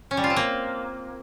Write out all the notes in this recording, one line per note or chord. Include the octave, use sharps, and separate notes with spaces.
C#4
G3
F4
C4
A#3